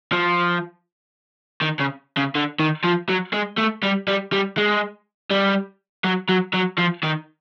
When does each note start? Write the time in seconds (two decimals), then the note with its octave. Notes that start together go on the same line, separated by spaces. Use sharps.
0.13 F3
1.61 D#3
1.79 C#3
2.17 C#3
2.35 D3
2.60 D#3
2.84 F3
3.09 F#3
3.34 G#3
3.58 A3
3.83 G3
4.08 G3
4.32 G3
4.57 G#3
5.31 G3
6.05 F#3
6.29 F#3
6.54 F#3
6.78 F3
7.04 D#3